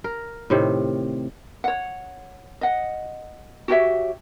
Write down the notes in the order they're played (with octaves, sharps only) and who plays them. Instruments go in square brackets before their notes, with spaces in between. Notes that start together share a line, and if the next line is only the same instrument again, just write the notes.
[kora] A#4
A2 C3 D#3
[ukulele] C#5 F#5
D#5 F#5
F#4 G4 C#5 E5